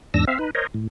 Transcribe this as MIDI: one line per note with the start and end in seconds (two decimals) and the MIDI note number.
0.14 0.25 40
0.14 0.25 44
0.14 0.25 62
0.14 0.25 88
0.14 0.25 94
0.27 0.38 60
0.27 0.38 76
0.27 0.38 77
0.39 0.51 63
0.39 0.51 71
0.55 0.67 70
0.55 0.67 72
0.55 0.67 73
0.55 0.67 75
0.74 0.87 45